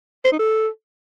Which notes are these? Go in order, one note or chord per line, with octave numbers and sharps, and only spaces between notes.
C5
D#4
A4